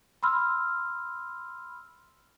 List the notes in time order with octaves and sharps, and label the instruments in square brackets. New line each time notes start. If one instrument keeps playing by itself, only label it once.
[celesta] B5 C6 E6 F6